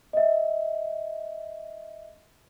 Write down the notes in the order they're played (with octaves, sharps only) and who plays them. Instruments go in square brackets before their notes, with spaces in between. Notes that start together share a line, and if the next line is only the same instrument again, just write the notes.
[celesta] D#5 E5